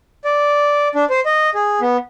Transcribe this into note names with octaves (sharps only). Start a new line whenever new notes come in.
D5
D4
C5
D#5
G#4
B3